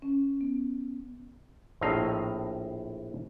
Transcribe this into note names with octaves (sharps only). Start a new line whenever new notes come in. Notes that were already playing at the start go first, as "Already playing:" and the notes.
C#4
B3
A#1 A2 C4 D#5 F5 A#5